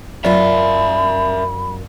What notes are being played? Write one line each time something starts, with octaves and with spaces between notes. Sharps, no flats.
F#2 F4 A#4 D5 E5 B5